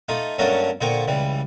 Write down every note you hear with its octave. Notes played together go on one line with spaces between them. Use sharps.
A3 D#4 F4
G2 F#3 A3 A#3 C#4 D4
A#2 D3 A#3 C5 G5 C#6
C#2 E3 G3